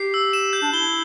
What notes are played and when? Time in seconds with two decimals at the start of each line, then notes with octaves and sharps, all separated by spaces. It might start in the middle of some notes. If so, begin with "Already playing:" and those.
Already playing: G4 C7
0.14 E6
0.33 E7
0.53 G6
0.62 D4
0.73 E4 G7